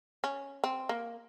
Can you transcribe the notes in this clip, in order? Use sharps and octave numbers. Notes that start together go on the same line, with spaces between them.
C#4
C4
A#3